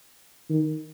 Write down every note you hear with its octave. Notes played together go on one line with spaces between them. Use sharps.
D#3